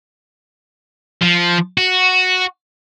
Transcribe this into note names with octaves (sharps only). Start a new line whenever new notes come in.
F3
F#4